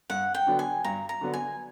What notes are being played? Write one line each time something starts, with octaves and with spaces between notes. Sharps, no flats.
G2 F#5
G5
D3 F#3 B3 D4
G#5
G2 A#5
A#5
D3 F#3 B3 D4
G#5